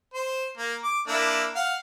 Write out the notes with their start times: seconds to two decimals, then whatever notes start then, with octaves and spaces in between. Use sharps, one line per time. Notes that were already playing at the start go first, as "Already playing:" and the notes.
0.14 C5
0.57 A#3
0.83 D6
1.08 A#3 D4 E4
1.55 F5 F#5